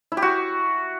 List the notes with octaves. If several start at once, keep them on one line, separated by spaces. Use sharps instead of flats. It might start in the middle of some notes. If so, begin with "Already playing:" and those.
E4
G4
F#4